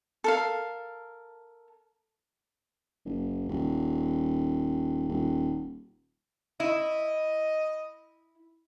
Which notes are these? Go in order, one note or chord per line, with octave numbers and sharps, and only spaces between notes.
A4 A#4 F5
F#1
D#1
D#1
E4 D#5